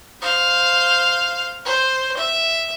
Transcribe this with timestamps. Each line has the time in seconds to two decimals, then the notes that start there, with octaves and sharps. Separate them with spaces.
0.22 C5 F5
1.65 C5
2.17 E5